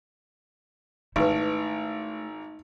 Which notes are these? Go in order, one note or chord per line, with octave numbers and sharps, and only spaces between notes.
G#1 A3 D#4 E4 B4 C#6